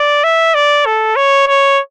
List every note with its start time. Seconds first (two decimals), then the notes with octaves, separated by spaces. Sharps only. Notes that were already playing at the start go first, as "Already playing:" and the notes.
Already playing: D5
0.24 E5
0.55 D5
0.86 A4
1.16 C#5
1.48 C#5